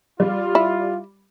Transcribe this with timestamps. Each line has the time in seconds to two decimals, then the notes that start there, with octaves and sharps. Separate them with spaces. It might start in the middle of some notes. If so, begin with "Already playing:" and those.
0.20 G3 F4
0.55 E4